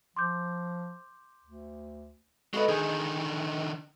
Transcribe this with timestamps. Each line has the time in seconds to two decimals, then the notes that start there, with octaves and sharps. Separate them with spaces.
0.16 F3 C6 D6 G6
1.44 D2
2.54 G#3 F#4 A4 B4 D#5
2.68 D3 D#3 G#4